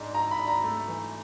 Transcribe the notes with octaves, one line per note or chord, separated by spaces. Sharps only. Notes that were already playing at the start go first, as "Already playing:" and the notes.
Already playing: G#2 D4
G#2 A#5
B5
D4
A#5
A3
E3